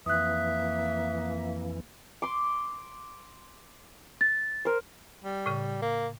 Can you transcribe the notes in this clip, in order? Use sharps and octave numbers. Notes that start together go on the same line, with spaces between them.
F2 E3 A#3 E5 D#6 F#6
C6 D6
A6
A#4 C5
G3
A2 C#3
A#3